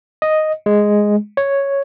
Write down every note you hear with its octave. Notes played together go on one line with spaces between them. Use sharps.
D#5
G#3
C#5